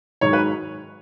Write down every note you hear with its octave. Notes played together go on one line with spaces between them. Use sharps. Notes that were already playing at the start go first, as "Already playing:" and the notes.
G#2 D#3 F#3 C#5
B4